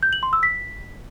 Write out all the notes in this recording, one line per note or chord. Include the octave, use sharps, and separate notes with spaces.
G6
F#7
C6
E6
B6